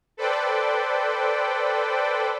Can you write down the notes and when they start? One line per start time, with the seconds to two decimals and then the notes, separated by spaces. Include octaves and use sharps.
0.17 A4 B4 C5 D5 G5